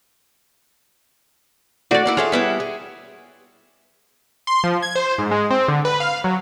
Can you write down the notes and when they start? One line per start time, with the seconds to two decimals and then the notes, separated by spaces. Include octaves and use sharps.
1.91 A3 D4 F#4 A4 D5
2.06 A#3 D4 E4
2.17 F4 G#4 A4 C#5 E5
2.32 G3 B3 E4 E5 D6
2.60 G#4
4.47 C6
4.64 F3
4.82 G#6
4.96 C5
5.18 G#2
5.31 G#3
5.51 C4
5.68 D3
5.85 B4
6.00 F5
6.24 F#3